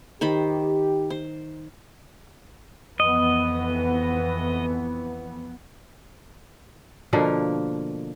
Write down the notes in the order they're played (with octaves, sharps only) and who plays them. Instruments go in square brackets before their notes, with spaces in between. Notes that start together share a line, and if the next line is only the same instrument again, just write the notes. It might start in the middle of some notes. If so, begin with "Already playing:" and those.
[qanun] D#3 C5 B5 [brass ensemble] G4
[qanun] C5
[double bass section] F2 E3 B3 [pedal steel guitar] D#5
[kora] B2 D3 F3 A#3